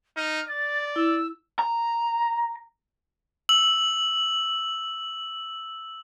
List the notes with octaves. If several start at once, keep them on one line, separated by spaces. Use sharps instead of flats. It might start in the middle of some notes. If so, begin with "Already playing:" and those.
D#4 F6
D5 A6
E4 E6
A#5
E6 F#7